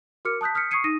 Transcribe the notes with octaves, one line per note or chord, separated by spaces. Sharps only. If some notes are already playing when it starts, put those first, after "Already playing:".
F#4 A#4 D6 F6 C#7
A5 D#6 F#6 G6 B6
D#6 F6 G6 B6 C#7
C#6 D#6 G#6 C7 C#7 D#7
D#4 D#6 A#6 D#7